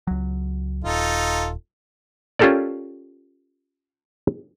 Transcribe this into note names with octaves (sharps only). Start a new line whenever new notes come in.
C#2 F#3
D#1 D#4 F4 A4
C#4 F4 G4 A4 A#4 D5